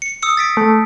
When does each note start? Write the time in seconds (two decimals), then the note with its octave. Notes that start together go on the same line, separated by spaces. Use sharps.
0.02 C#7
0.22 D#6 E6 C#7
0.37 A6 B6 D7
0.57 A3